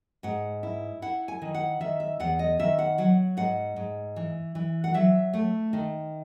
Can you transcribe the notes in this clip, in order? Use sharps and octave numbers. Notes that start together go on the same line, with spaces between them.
G#2 F#5
E4
E4 F#5
G#5
D#3
F#5
D#3 E5
E5
E2 F#5
D#5
D#3 E5
F#5
F#3 F#5
G#2 F#5
G#2
E3
E3
F#5
F#3 E5
A3
D#3